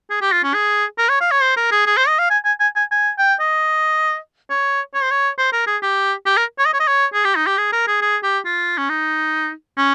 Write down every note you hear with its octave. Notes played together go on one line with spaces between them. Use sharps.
G#4
G4
F4
C#4
G#4
A#4
C#5
F5
C#5
C5
A#4
G#4
G#4
C5
D#5
F5
G#5
G#5
G#5
G#5
G#5
G5
D#5
C#5
C#5
C5
C#5
C5
A#4
G#4
G4
G4
A#4
C#5
D#5
C#5
D#5
C#5
G#4
G4
D#4
G4
G#4
A#4
G#4
G#4
G4
F4
C#4
D#4
C#4